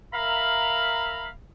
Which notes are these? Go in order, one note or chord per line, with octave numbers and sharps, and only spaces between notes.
A#4 E5 F5 A#5 B5